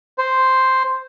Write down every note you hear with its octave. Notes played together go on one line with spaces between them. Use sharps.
C5